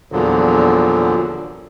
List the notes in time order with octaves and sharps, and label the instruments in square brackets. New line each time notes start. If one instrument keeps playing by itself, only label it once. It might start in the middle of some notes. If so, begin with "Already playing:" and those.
[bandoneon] E2 A#2 D3 F3 F#3